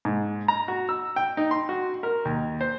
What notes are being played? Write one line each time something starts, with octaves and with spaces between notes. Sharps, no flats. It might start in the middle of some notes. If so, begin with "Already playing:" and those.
G#2
A#5
F#4
E6
G5
D#4
C6
F#4
A#4
D#2
C5